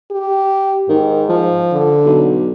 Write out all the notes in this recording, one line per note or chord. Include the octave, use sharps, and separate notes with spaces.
G4
G#2 D#3
F3
D3
B1